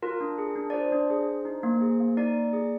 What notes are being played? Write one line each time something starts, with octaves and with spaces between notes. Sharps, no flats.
F4 A#4
D4
G#4
D4
D5
F4 C5
D4
G#4
D4
D#4
A#3
G#4
A#3
D#4 D5
A#3
G#4